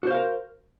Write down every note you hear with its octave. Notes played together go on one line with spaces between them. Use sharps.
F#4 A#4 C5 F5